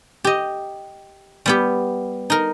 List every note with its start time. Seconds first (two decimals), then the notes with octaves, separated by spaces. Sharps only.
0.24 G4 D#5
1.46 G3 B3 G4
2.30 D#4 A#4